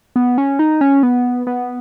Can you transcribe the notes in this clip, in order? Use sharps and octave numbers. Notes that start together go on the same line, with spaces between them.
B3
C#4
D#4
C#4
B3
B3